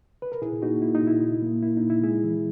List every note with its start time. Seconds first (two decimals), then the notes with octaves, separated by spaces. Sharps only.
0.22 B4
0.32 A#4
0.41 A#2 E4 G#4
0.62 A#3 D#4 F#4
0.82 A#3 E4
0.95 D#4
1.02 A#2 E4
1.23 A#2
1.42 A#3
1.63 A#3 E4
1.77 D#4
1.84 A#2
1.90 E4
2.03 G#3 E4 G#4
2.24 E3